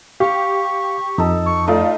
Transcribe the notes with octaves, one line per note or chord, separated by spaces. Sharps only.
G4 F5 C#6
F2 D#4 A4
C#6
A3 D#4 F4 D5